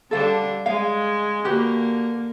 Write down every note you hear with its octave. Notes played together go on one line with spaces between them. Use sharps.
D3 G3 D4 A4 F5
G#3 F5
D3 A#3 F#4 G4 B4